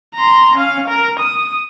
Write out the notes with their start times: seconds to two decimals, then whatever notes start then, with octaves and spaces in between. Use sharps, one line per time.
0.15 A#5 C6
0.56 C#4 F5
0.88 A#4
1.20 D#6